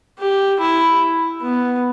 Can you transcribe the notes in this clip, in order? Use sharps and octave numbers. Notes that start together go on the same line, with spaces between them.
G4
E4
B3